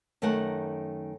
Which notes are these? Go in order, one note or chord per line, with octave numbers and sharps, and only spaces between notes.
F#2 D#3 A3 A#4 F#5 A5